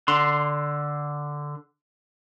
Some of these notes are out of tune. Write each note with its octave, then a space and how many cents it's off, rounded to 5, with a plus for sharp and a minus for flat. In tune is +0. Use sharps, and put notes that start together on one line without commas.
D3 +0 C6 +0